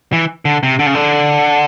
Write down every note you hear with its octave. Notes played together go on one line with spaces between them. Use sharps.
E3
D3
C3
D3
C#3
D3